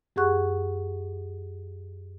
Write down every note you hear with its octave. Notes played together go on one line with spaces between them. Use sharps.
F#2 G4 G#4 F#5 C#6 F#6